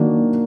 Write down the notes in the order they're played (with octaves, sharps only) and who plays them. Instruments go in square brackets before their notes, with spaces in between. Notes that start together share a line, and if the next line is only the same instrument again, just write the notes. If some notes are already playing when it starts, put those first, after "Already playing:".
Already playing: [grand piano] D#3 F#3 A#3 D4 F#4